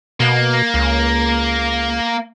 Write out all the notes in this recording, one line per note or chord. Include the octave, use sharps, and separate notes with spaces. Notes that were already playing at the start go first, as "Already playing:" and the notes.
B2 A#3
C#2